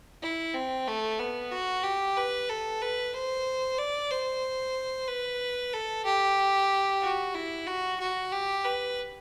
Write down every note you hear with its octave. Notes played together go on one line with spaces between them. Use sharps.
E4
C4
A3
B3
F#4
G4
B4
A4
B4
C5
D5
C5
B4
A4
G4
F#4
E4
F#4
F#4
G4
B4